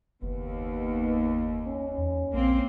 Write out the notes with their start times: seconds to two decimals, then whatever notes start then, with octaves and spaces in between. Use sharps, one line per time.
0.22 F#1 D#2 B3
1.67 C#4
1.98 E2
2.34 A#1 A#3 C4